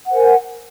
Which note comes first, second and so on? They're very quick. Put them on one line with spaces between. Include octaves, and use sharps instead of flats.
F#5 C5 A#4 G#5